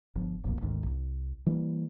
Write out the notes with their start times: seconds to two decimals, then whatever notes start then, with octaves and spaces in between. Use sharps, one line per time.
0.15 G1 F3
0.44 D1 B1 F2 A#2
0.62 G#1 D2 G#2 D#3
0.86 C2
1.46 E3 G3 A#3